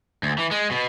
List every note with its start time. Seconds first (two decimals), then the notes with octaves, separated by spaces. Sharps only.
0.23 D2
0.38 E3
0.51 G#3
0.71 B2